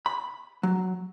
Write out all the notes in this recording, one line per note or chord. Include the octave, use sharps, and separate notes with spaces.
B5
F#3